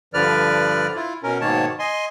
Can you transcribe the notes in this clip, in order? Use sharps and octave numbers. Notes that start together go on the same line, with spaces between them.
G2 D3 F3 B4 D5 F6
E4 F4
B2 C#4 A#4
G#2 B2 D#3 A#3 C#5 A5
D#5 G#5 C6